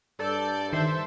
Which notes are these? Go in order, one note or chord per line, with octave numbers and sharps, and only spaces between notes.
G2 A4 D5 G6
D#3 A4 C5 E5